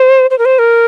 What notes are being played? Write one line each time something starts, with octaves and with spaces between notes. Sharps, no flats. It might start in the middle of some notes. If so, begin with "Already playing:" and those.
Already playing: C5
C5
A#4
C5
A#4